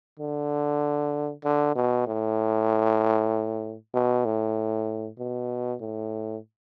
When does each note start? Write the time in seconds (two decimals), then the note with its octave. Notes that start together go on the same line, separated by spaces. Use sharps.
0.20 D3
1.44 D3
1.76 B2
2.07 A2
3.94 B2
4.25 A2
5.19 B2
5.81 A2